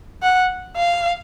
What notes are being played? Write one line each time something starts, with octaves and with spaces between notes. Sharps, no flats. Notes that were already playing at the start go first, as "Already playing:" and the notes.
F#5
F5